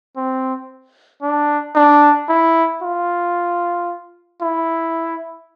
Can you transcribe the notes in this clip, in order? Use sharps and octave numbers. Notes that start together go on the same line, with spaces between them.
C4
D4
D4
E4
F4
E4